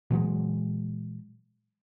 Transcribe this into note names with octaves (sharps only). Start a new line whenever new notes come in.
A#2 E3 F#3 G#3